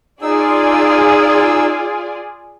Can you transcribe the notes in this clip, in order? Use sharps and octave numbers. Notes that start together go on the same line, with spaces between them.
D#4 F4 G#4 D5 E6